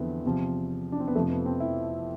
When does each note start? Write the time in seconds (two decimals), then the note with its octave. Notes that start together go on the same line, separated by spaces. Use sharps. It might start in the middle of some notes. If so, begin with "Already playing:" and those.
Already playing: E2 D3 F3 B3 C4 E4
0.24 E2 C3 F3
0.92 D4
1.00 C4
1.08 B3
1.15 F2 C3 F3 A3
1.30 B3
1.46 C4
1.60 E4